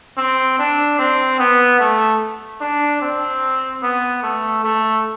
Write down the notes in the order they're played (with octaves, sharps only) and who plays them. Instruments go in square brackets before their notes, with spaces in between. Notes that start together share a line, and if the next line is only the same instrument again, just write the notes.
[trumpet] C4
D4
C4
B3
A3
D4
C4
B3
A3
A3